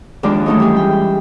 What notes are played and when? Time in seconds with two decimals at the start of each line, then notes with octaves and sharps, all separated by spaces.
0.23 D#2 F3 G#3 D4 F4 D5
0.46 E3 F#3 A3 C#4 D#4
0.60 G3 G4 G#4
0.77 G5